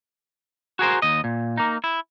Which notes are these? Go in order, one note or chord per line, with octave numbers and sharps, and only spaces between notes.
F#4 G#4 A#4 C5
D#2 D#5
A#2
A#3 D#4
E4